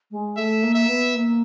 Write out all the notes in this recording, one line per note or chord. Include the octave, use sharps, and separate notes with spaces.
G#3
A3 E5
A#3
E5
B3
A#3